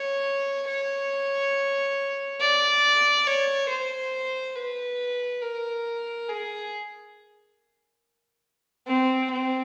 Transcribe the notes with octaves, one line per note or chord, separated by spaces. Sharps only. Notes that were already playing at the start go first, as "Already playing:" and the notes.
Already playing: C#5
C#5
D5
C#5
C5
B4
A#4
G#4
C4
C4